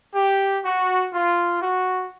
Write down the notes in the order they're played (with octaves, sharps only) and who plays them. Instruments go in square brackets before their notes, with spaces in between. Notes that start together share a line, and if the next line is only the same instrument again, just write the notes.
[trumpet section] G4
F#4
F4
F#4